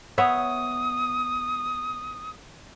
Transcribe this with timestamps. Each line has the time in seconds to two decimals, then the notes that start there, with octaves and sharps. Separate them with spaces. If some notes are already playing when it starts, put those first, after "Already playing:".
0.18 B3 C#5 E5 D#6